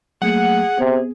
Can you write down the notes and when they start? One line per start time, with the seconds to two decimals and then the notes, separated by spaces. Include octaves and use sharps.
0.22 F#3 A3 A#3 G#4 F#5
0.79 C3 B3